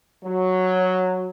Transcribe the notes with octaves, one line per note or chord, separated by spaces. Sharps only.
F#3